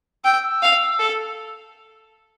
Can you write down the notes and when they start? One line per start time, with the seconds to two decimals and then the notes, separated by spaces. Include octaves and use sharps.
0.24 G5 E6
0.43 E6
0.62 F5
0.99 A4